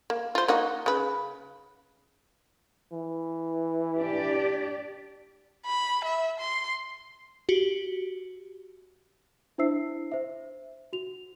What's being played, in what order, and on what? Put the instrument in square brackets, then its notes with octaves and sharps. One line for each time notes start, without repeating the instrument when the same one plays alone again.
[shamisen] A#3
F4 C5
A#3 D#4 F#4
C#3 B4
[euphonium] E3
[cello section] D4 G4 D5
[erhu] B5
E5
C6
[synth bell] F#4 G4
[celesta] D4 E4 C5 E5 E6 C7
C5 E5
F#4 F7